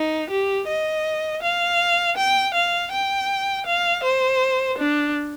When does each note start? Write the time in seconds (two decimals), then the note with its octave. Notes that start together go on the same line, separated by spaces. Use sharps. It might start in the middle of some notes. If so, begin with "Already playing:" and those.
Already playing: D#4
0.30 G4
0.68 D#5
1.43 F5
2.17 G5
2.54 F5
2.92 G5
3.67 F5
4.03 C5
4.78 D4